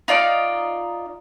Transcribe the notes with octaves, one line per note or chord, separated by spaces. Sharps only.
D#4 F4 D5